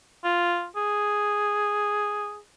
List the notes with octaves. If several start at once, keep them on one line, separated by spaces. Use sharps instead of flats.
F4
G#4